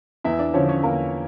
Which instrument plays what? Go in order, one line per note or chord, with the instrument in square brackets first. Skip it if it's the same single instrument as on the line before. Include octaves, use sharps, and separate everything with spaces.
[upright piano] E2 E4 E5
D4 D5
D3 F3 C#4 C#5
C#4 C#5
E2 A#3 A#4